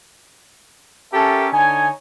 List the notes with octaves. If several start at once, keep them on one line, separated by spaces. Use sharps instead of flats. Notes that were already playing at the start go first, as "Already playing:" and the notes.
C#4 G4 A4 A#4 E5 A5
D3 D#4 C#5 G#5